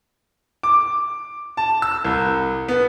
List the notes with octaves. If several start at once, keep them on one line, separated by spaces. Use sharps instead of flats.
D6
A5
E6
C2
B3